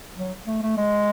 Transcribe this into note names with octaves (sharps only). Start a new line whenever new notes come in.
F#3
A3
A3
G#3